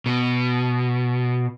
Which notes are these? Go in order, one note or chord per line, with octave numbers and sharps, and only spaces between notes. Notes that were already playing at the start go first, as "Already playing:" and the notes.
B2